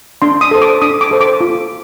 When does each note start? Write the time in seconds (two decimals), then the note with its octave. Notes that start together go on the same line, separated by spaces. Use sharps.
0.22 D4 C6
0.41 D#6
0.51 A4 C5
0.62 D6
0.82 D4 D#6
1.01 D6
1.11 A4 C5
1.21 D6
1.41 F4